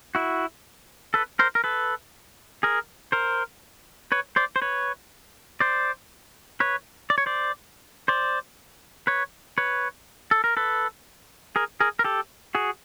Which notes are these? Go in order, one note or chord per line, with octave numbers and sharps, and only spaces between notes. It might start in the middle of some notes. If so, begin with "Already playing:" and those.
E4 F#4
A4 B4
A#4 C5
A#4
A4 B4
G#4 A#4
A#4 C5
B4 C#5
C5 D5
C5
B4 C#5
C5 D5
B4 C#5
D5
C#5
C5 D5
C5 D5
B4 C#5
B4 C#5
A4
A#4
A4 B4
G#4 A#4
G#4 A#4
A#4
G4 A4
F#4 G#4